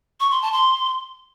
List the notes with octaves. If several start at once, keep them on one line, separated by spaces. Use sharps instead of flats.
C#6
C6
A5
C6